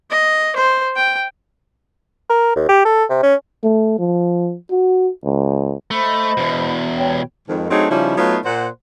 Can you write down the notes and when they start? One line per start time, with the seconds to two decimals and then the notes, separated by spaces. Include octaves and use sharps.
0.10 D#5
0.56 C5
0.96 G5
2.30 A#4
2.56 D#2
2.69 G4
2.85 A4
3.10 C3
3.23 C#4
3.64 A3
3.99 F3
4.71 F#4
5.25 C#2
5.91 A3 C5 D#5 B5
6.37 E2 B2
6.97 G4 C#5 G5
7.48 F2 G#2 D#3
7.70 F#3 A3 C4 D4 D#4 G#4
7.90 C#3 F3 G3 C#4 D#4 E4
8.17 F#3 A3 B3 D#4 F4
8.45 A#2 C5 F#5